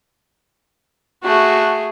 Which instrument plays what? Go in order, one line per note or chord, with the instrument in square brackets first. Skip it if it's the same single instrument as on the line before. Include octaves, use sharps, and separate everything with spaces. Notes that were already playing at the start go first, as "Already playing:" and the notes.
[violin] A3 G#4 [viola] F#4